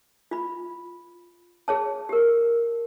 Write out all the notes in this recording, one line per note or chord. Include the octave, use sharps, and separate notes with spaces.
F4 B5
G#4 C#5 A5
G4 A#4